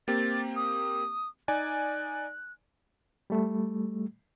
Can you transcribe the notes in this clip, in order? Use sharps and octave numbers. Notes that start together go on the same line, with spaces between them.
A#3 C4 G4 A6
D#6
D#4 D5 G#5 F#6
G3 A3